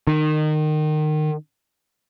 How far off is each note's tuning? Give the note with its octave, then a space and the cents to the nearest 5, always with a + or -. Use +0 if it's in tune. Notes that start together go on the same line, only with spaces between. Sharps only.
D#3 -25